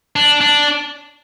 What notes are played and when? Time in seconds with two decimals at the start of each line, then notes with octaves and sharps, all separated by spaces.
0.16 D4
0.41 D4